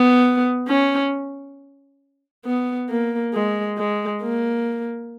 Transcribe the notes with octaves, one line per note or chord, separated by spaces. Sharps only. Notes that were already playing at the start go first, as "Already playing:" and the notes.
Already playing: B3
C#4
B3
A#3
G#3
G#3
A#3